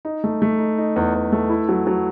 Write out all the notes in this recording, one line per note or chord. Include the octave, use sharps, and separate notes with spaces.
D#4
A3
A3
D#4
D#4
E2
E2
A3
E4
F#3
F#3